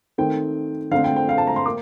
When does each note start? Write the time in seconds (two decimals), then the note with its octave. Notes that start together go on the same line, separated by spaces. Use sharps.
0.18 D#3 A3 C4 G5
0.91 D3 A3 C4 F5
1.04 G5
1.16 G5
1.29 F5
1.38 A5
1.47 A#5
1.56 C6
1.66 A#3 D6